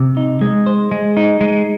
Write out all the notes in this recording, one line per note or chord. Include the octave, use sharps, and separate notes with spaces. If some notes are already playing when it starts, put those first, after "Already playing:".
Already playing: C3
D#4
G#3
C5
G#3
D#4
G#3